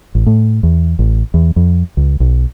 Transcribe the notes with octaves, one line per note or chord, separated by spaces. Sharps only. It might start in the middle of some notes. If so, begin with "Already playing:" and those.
A1
A2
E2
A1
E2
F2
C#2
B1